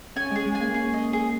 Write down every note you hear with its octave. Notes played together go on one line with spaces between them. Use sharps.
C#4 G#5
G#3 G#4
G#3
G#5
A#3
C#4 G#4
D#5
G#4